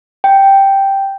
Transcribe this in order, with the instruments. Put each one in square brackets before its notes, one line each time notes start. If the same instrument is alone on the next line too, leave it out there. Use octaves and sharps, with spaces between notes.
[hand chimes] G5